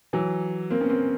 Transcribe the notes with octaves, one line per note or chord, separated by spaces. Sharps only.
E3 F#3
A#3 C4
B3 C#4
A#3 C4